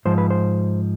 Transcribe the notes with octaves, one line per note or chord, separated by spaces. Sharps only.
G#2 F3 C5
B4
C5